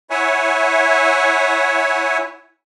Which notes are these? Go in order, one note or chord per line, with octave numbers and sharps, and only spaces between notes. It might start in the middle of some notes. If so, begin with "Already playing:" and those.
E4 C#5 E5 F#5 G#5